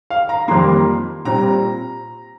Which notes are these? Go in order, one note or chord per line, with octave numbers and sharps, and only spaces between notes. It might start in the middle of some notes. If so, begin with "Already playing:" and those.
F5
A#5
F2 D#3 G3 A#3 C6
A#2 G3 C4 A#5